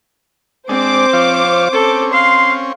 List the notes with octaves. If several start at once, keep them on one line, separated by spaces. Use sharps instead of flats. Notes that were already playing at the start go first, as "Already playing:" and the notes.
G#3 C4 D4 C5 D6
F3 F4 C#5
C4 C#4 A4
F5 C6